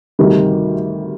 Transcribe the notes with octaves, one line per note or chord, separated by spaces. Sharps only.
D2 C3 D#3 G3